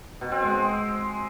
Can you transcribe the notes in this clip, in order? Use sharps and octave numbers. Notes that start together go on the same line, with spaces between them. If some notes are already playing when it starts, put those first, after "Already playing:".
B2
C4
G#3